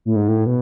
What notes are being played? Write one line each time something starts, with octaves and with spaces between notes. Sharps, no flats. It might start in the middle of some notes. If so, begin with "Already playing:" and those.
A2
G#2
A2
B2